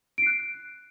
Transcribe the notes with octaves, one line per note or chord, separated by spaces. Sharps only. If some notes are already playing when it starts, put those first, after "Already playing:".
F#6 C7 D7